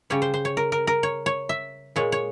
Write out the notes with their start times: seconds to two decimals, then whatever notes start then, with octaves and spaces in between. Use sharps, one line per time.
0.10 C#3 G3 C#5
0.22 C5
0.34 C5
0.45 C#5
0.57 A#4
0.72 A#4
0.87 A#4
1.03 C#5
1.26 C#5
1.49 E5
1.96 A#2 G#3 C#5
2.12 C#5